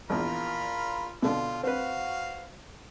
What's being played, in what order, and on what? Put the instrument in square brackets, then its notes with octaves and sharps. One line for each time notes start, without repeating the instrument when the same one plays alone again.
[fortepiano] A#1 E2 [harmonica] F4 A#4 B5
[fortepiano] B2 D3 [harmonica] F4
[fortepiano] C4 B4 [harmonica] F#4 F5